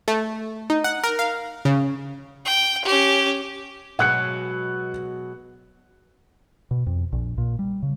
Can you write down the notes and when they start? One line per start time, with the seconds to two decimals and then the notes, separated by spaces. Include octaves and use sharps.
0.08 A3
0.70 D#4
0.84 F#5
1.04 A#4
1.19 F5
1.65 C#3
2.45 G5
2.85 C#4 G4
3.99 B2 F#3 G#3 F#5 F#6 C#7
6.71 B2
6.86 F2
7.12 A#1
7.38 A#2
7.59 G3
7.83 C#3